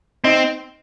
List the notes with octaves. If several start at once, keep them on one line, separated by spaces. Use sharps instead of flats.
C4 D#4